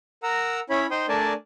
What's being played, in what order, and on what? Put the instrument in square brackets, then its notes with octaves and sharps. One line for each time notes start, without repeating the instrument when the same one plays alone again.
[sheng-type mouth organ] A#4 F#5 A#5 E6
C#4 E4 C#5 B5
D#4 C5 G5 C6 D#6
A3 D4 A#4 D5 G#5 A5